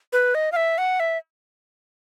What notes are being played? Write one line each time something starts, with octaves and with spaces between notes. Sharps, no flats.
B4
D#5
F5
E5
F#5
E5